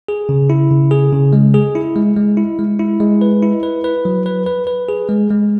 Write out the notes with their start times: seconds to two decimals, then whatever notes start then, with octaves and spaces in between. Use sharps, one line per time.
0.08 G#4
0.29 C#3
0.50 E4
0.71 C#3
0.91 G#4
1.12 C#3
1.33 G#3
1.54 G#4
1.75 E4
1.96 G#3
2.17 G#3
2.37 E4
2.59 G#3
2.79 E4
3.00 G#3
3.21 B4
3.42 E4
3.63 B4
3.84 B4
4.05 F#3
4.26 B4
4.46 B4
4.67 B4
4.89 G#4
5.09 G#3
5.30 G#3